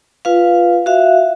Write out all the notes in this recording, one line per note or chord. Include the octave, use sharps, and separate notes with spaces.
F4 B4 F5
F#4 E5 F5